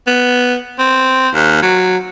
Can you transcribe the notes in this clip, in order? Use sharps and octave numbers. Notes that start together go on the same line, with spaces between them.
B3
C4
D#2
F#3